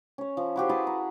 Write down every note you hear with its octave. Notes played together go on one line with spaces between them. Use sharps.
C#4 C#5
F3
E4 F#4 G4 C5
E4 G#4 B4 A5
A#5